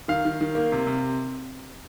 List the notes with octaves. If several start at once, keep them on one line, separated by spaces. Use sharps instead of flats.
D#3 F5
D#3
D#3
A#3
C3
C3